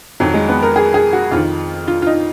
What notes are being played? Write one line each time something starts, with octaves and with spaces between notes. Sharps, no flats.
F2 D#3 F#3
G#3
B3
A#4
G#4
G#4
F#4
F2 D#3 F4
F4
F4
D#4